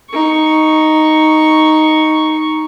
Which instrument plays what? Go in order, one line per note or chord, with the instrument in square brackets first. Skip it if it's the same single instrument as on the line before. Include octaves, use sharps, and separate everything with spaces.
[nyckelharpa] D#4 C#6